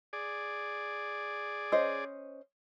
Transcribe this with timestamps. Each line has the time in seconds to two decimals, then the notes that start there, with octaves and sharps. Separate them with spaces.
0.13 G#4 D5
1.72 C#4 C5 D#5